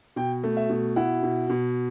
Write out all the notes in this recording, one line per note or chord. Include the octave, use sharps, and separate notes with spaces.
B2 G5
A3
E5
B2
E4 F#5
B2
B2